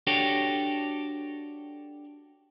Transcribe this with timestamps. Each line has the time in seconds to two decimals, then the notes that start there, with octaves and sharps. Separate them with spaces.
0.07 D4 F#4 G4 A4 C#5